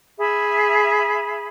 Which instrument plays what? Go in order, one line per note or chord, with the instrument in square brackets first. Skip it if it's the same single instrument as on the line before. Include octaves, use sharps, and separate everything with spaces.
[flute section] G#4 E5 B5